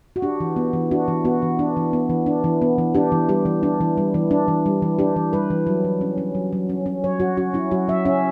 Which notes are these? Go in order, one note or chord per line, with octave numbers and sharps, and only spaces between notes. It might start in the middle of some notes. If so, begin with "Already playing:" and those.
F#4
D4 G4
E3
B3
E3
D4 F#4
E3
B3 F#4
E3
D4
E3
B3
E3
D4
E3
B3
E3
D4 G4
E3
G3 G4
E3
D4
E3
G3
E3
D4
E3
G3
E3
D4 G4
E3
G3 B4
E3
F#3
F#3
C#4
C#4
F#3
F#3
C#4
C#4
F#3 C#5
F#3 F#4
C#4 F#4
C#4 E4
F#3 F#4
F#3 E5
C#4 E5